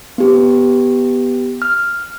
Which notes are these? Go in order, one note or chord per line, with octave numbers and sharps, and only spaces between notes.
B3 G4
F6